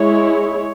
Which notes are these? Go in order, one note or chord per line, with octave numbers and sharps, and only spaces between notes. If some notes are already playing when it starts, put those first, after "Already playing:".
Already playing: G#3 E4 C#5